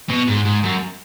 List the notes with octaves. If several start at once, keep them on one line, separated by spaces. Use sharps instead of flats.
B2
G#2
G#2
F#2